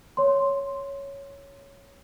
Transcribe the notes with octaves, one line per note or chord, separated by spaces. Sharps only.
C#5 C6